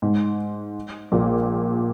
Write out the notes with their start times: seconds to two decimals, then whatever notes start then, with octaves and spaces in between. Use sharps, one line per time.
0.02 G#2
1.12 A#1 A#2